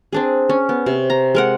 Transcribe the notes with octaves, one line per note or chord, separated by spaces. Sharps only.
C4 D4 G#4
C#4
B3
C3
A#5
G#3 A#4 F#5